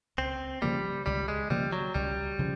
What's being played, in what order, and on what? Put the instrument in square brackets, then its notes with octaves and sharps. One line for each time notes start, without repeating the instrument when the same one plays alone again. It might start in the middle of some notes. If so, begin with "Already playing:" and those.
[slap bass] C#2 [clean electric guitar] C4
[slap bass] C#3 F3 A#3 [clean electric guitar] G3
[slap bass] C#2 [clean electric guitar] G3
[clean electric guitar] G#3
[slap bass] C#3 F3 A#3 [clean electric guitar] G3
[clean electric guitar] F#3
[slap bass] C#2 [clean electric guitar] G3
[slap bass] C#3 F3